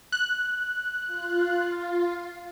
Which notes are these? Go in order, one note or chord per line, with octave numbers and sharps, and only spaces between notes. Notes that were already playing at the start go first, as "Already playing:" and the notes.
F#6
F4